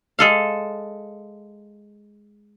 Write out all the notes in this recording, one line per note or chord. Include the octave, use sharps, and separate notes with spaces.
G#3 A4 F5